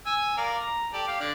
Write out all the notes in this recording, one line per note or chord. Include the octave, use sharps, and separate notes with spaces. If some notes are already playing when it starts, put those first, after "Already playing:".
G#5 E6
A#4 D5 F5
A#5
G4 A4 D5
G4 F5
D3 D5